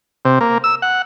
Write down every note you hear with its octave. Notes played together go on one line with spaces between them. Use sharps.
C3
A#3
E6
F#5